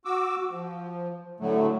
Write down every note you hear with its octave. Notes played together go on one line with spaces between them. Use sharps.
F#4 D6 E6
F3
A2 D3 F#3 A3